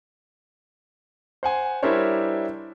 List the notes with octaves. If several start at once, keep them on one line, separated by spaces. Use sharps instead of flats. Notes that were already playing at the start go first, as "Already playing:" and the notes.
C5 F#5 G#5
G3 D4 E4 A#4 C5 C#5